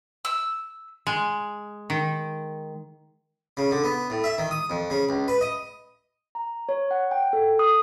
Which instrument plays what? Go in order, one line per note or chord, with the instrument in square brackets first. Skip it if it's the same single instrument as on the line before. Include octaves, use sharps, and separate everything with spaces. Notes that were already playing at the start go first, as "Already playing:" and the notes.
[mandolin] E6
[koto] G#3
D#3
[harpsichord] C#3
D3
B3
A2
E5
D#3
D#6
F2
C#3
C#2
B4
D#5
[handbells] A#5
C#5
F#5
G5
A4
D#6